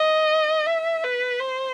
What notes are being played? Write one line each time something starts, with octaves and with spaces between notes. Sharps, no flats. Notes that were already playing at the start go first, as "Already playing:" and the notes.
Already playing: D#5
E5
B4
C5